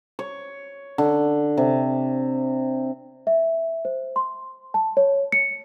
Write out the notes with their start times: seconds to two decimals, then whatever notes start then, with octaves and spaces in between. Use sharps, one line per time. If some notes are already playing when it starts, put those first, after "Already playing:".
0.19 C#5
0.98 D3
1.57 C3
3.27 E5
3.85 C5
4.16 C6
4.74 A5
4.97 C#5
5.32 C#7